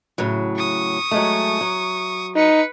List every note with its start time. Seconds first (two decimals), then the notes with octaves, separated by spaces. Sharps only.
0.18 A2 C#3 F#3
0.56 C#6 D#6
1.11 F#3 G#3 A3
1.61 F#3
2.35 D#4 B4 C#7